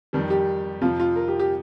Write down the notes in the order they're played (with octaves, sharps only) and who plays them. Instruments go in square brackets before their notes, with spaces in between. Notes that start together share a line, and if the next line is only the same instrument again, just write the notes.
[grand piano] F2 D#3 G3
[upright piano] G4
[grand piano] F2 C3 F3 [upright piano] F4
[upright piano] F4
A#4
G4
G4